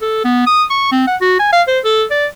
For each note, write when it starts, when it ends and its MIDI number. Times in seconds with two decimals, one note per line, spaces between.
0.02 0.22 69
0.25 0.47 59
0.47 0.64 87
0.70 0.91 85
0.92 1.05 60
1.07 1.16 78
1.21 1.35 66
1.39 1.50 80
1.53 1.62 77
1.68 1.79 72
1.85 2.04 69
2.11 2.26 74